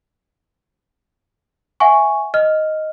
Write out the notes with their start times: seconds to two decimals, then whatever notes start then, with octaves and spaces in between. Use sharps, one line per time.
1.80 E5 F#5 G#5 C#6
2.34 D#5 F6